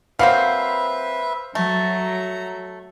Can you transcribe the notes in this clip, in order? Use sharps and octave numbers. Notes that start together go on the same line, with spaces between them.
F#3 A#3 C4 B4 C5 E5 F5
F#3 A3 A#5